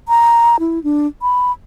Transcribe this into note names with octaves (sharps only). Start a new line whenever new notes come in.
A#5
E4
D4
B5